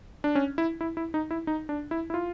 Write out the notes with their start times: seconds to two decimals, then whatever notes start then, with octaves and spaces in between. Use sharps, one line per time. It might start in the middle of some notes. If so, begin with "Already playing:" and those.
0.24 D4
0.35 C#4
0.58 E4
0.81 E4
0.97 E4
1.14 D#4
1.31 E4
1.47 D#4
1.69 D4
1.91 E4
2.10 E4
2.14 F4